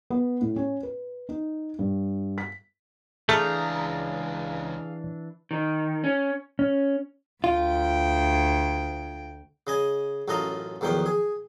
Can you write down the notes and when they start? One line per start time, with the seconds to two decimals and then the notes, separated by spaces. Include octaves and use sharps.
0.10 B3
0.41 A2
0.56 C#4
0.83 B4
1.29 D#4
1.79 G2
2.38 B6
3.29 C#2 E3 A3 D4 G#4 F5 A#5 G6
5.51 D#3
6.04 C#4
6.59 C#4
7.44 D2 F4 G5
9.67 C#3 D#5 G#5
10.28 A1 F#2 A3 F4 D#5 A#5
10.81 B1 E2 D#3 F3 G5
11.06 G#4